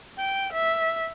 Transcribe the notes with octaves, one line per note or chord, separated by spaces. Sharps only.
G5
E5